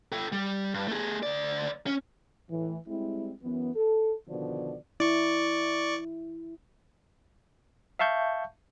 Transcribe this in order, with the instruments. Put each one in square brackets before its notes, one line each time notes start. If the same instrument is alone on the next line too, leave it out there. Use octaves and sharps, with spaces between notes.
[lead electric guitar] A4 G5
G3
G2
A3 G#4
D2 D5
C#4
[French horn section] A2 E3
G3 G#3 C4 E4
F#2 E3 B3
A4
B2 D3 D#3 F3 D5
[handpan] E4 [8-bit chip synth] D5 C#6
[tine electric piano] E5 F5 A5 C#6 G6